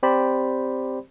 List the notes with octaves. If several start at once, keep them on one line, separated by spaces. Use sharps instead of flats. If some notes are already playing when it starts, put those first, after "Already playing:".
C4 G4 C5 D5 B5